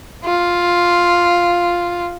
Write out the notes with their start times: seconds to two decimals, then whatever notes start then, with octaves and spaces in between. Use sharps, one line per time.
0.25 F4